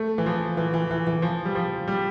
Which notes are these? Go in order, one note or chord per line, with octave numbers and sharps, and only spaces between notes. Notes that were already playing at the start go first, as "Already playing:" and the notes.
Already playing: A3
E3
F3
E3
E3
E3
E3
F3
G3
F3
G3